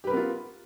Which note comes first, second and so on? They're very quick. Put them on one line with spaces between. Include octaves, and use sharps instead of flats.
G4 B4 A#4 B3 F4